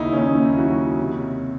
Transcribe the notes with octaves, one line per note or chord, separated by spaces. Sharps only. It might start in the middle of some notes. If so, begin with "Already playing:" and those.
Already playing: D#2 C#3 D#4 E4
C#4
D#2 D#4
E4
F#3 F#4
C3